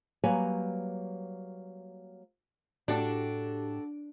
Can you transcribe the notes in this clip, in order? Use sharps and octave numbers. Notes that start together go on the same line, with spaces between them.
F#3 G3 A#3 B4 C#5 G#5
A2 D4 F#4 G4 A4